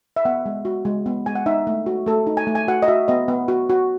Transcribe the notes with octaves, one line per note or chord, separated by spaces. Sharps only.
E5
B3 F#5
G#3
F#4
G#3
B3
G#3 G#5
F#5
D#4 E5
A3
F#4
A3 A4
D#4
G#5
A3
G#5
F#4 F#5
D#5
F#4 E5
B3 D#5
B3
F#4
F#4